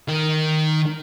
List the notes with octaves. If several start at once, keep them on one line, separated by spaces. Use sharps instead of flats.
D#3